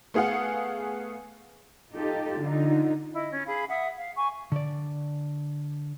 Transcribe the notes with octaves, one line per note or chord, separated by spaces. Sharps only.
A3 B3 G#4 F5 F#5
D#4 F4 G4 A4
D3 D#4 F4
E4 D#5
C#4
G#4 F5 B5
E5 F#5 D#6
F5
G#5 C#6
D3 D5